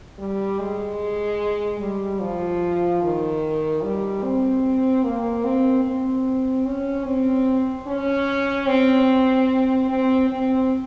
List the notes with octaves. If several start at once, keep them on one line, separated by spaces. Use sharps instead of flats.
G3
G#3
G3
F3
D#3
G3
C4
A#3
C4
C4
C#4
C4
C#4
C4
C4
C4